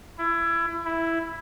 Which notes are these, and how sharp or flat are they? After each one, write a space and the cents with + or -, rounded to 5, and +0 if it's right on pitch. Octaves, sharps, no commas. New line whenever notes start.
E4 +25
E4 +0